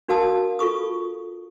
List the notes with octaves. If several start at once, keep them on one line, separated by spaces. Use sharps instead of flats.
D4 F#4 A#4 F5 A5 D#6
F4 A4 C#6 D#6